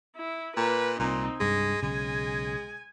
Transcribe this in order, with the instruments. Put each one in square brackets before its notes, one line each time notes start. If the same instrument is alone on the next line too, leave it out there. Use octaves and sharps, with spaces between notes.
[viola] E4
[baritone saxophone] A#2 [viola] B4
[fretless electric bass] C2 [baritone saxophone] A#2 [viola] C4 D#4
[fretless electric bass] C2 G2 [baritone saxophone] G#3 [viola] G#5
[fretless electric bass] B1 C#3 [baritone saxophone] G#3